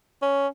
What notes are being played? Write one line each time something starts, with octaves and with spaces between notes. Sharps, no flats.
C#4